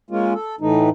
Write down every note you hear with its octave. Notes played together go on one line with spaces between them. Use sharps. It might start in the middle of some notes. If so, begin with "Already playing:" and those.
G#3 A#3 C#4 F4
A4
A2 E3 A3 D#4